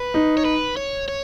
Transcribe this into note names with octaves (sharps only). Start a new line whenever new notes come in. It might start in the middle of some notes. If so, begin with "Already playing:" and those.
Already playing: B4
D#4
C#5
B4
C#5
C#5